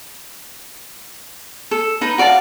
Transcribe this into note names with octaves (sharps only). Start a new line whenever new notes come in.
A4
D#4 B4
F#4 D5 F5 A5